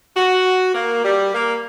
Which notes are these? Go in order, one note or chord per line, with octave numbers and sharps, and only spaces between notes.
F#4
A#3
G3
A#3